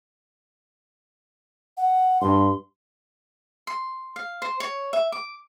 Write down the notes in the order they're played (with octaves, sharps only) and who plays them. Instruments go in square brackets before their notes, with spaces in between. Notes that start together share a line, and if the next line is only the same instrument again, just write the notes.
[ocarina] F#5
[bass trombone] G2 [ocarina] C6
[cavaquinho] C6
F5
C5
C#5
E5
D6